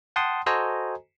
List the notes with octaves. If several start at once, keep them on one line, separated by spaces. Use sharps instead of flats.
F#5 G5 A5 C6 D#6
F#4 A4 C5 D#5 G#5 A#5